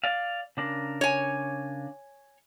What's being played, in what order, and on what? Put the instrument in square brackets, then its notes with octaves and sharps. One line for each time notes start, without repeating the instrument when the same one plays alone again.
[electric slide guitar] D5 F5
C#3 D4 A#4
[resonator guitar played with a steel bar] C#5 G#5